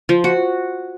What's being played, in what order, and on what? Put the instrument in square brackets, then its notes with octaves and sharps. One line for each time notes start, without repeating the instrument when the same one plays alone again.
[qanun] F3
F#4